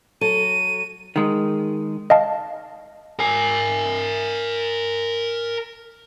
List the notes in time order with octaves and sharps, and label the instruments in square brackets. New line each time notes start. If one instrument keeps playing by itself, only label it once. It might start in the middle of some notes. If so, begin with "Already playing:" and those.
[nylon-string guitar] F#3 A4 [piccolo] D#7
[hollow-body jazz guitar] D#3 G#3
[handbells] D#5 F5 A5
[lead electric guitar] A#4 G#5